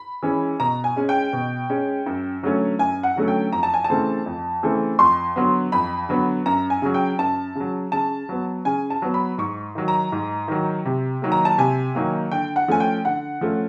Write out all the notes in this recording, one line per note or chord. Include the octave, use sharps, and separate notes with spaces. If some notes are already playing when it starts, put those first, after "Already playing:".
Already playing: B5
E3 G#3 C#4
B2 A#5
G#5
G#3 C#4
G5
B2
G#3 C#4
F#2
D3 F#3 A3 C#4
F#2 G#5
F#5
D3 F#3 A3 C#4
G5
F2 A#5
A5
G#5
A5
C#3 E3 A3 C4
F2
C#3 E3 A3 C4
F2 C6
D3 F#3 B3
F2 B5
D3 F#3 B3
F#2 A#5
G#5
C#3 F#3
G5
F#2 A5
C#3 F#3
C#3 A5
F#3 B3
C#3 G#5
A5
F#3 B3
B5
G#2 C#6
D#3 F#3
A#5
G#2
D#3 F#3
C3
D#3 F#3 A#3
A#5
A5
C3 G#5
D#3 F#3 A#3
D3 G5
F#5
F3 A3 C#4 G#5
G5
D3 F#5
F3 A3 C#4